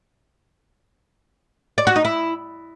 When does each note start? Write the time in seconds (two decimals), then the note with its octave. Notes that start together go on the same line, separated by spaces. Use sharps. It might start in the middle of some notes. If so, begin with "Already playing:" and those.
1.78 D5
1.87 F#4
1.96 D#4
2.05 E4